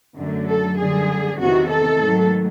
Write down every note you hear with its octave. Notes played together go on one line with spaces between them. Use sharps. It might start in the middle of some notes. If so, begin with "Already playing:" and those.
F#2 D3 F#3 A3
A4
F#2 D3 G3 G#4
E2 C3 D#3 F#4
A4
G#2 D#3 F#3 A3